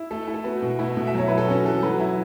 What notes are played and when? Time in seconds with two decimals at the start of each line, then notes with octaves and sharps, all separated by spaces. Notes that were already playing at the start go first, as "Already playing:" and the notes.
Already playing: E4
0.11 A3 A4
0.28 E4
0.34 A4
0.44 B3 F#4
0.62 B2
0.79 A3 E4
0.97 B2
1.07 E5
1.14 F#3 C#5
1.28 E4 B4
1.38 A4
1.48 C#4 F#4
1.65 E3 A4
1.82 F#3 B4
2.00 E4